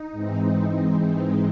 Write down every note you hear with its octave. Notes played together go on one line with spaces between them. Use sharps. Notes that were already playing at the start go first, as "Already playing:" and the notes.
Already playing: D#4
G#2 E3 G#3 C4
D#4